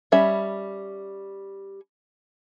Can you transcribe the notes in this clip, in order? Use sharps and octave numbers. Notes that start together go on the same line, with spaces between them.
G3 C#4 E5 B5